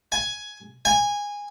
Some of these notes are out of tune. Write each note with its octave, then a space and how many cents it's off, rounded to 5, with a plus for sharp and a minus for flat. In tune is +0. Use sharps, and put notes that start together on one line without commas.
G#5 +10
G#5 -15